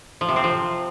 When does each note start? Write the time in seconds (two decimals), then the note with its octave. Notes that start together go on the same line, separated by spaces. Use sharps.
0.21 F3
0.29 C3
0.36 C4
0.44 F3